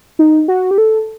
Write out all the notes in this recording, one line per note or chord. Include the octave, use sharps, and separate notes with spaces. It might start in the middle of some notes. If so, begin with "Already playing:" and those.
D#4
F#4
G4
A4